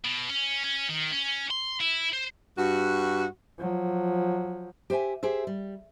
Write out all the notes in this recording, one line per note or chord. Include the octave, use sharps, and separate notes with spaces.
B2
C#4
C#4
D#3
C#4
C6
E4
C5
G2 F#4
F3 F#3
G4 C5 E5 G#5
G4 G#4 C5 E5
G3